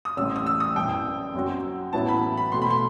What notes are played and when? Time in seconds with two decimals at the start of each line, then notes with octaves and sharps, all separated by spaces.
0.05 D#6
0.17 A1 A2 G3 C4 E6
0.36 D#6
0.46 E6
0.60 D#6
0.75 F#2 E3 G3 G5
1.34 F#2 F#3 C4 F#4
1.93 A1 A2 F#3 B3 E4 A5
2.08 B5
2.37 B5
2.52 B2 A3 C4 F#4 C6
2.62 B5
2.70 C6